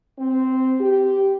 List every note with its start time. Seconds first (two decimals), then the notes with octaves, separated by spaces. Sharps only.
0.19 C4
0.80 G4